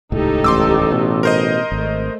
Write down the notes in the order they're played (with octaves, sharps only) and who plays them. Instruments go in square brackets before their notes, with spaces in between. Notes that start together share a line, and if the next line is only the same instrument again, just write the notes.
[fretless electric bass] D#1 C#2 A2 [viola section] D#4 G4 A4
[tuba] A1 [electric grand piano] C6 D6 E6
[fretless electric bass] B2
[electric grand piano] A#4 C5 D#5
[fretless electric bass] G#1 [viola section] A3